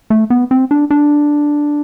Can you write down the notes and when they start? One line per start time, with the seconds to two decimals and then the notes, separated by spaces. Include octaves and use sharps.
0.10 A3
0.30 B3
0.51 C4
0.71 D4
0.90 D4